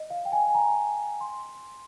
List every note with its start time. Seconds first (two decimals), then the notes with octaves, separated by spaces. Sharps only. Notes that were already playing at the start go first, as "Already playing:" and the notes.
Already playing: D#5
0.10 F5
0.25 G5
0.32 G#5
0.54 A#5
1.21 C6